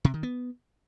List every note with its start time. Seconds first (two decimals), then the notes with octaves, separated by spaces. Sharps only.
0.05 C3
0.14 D#3
0.23 B3